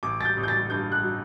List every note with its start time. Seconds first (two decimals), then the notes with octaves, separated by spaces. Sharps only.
0.03 A1 D6
0.21 A6
0.25 G6
0.37 A1
0.43 G6
0.48 A6
0.70 G2 G6
0.92 F#6
1.04 F#3